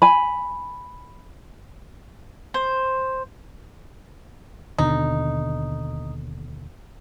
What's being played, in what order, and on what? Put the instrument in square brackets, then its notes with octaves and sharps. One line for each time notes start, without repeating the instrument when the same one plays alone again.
[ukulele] G#5 B5
[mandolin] C5
[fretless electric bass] D#2 B2 D3 [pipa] D#4